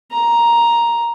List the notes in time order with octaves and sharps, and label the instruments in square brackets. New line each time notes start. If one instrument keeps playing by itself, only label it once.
[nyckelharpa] A#5